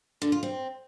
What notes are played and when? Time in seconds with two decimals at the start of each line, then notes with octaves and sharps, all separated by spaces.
0.22 D3
0.32 F4
0.43 C4